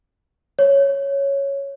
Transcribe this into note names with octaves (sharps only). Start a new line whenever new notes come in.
C#5